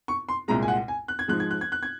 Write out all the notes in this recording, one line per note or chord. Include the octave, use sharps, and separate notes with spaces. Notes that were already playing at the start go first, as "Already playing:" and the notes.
C#6
C6
C2 A#2 G#3 A#5
G#5
F#5
G#5
F#6
G#6
G#2 F3 G#3 F#6
G#6
F#6
G#6
F#6
G#6